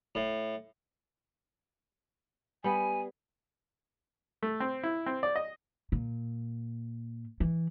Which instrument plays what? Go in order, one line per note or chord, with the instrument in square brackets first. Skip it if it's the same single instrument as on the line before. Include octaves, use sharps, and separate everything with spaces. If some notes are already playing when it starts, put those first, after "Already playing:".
[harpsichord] A2
[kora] G3 B3 [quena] G#5
[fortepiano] A3
C4
E4
C4
D5
D#5
[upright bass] A#2
E3